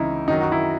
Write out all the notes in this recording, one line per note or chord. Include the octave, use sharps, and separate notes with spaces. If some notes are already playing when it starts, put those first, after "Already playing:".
Already playing: C#2 C#3 E3 D#4 E4
F#2 D#3 F#3 D#4
F#4
E4